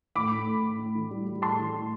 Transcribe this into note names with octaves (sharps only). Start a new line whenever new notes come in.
A2 B5 D6
A2
A2
A2
A2
E3
G3
G3
A2 A5 C6
E3
A2